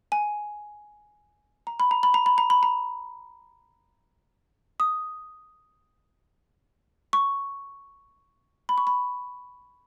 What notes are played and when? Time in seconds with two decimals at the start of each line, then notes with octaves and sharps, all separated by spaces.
0.12 G#5
1.67 A#5
1.80 B5
1.91 A#5
2.03 B5
2.14 A#5
2.26 B5
2.38 A#5
2.50 B5
2.63 A#5
4.80 D#6
7.13 C#6
8.69 B5
8.78 C#6
8.87 B5